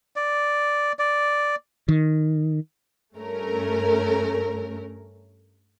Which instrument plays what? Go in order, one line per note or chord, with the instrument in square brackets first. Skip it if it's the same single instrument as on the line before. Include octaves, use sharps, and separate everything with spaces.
[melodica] D5
D5
[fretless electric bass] D#3
[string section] G2 A3 C#4 A#4